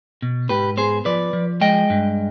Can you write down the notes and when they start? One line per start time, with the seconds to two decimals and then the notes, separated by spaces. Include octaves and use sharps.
0.22 B2
0.49 G#2 G4 B4
0.77 B3 G#4 C5
1.05 F3 B4 D5
1.33 F3
1.61 G#3 D#5 G5
1.90 G2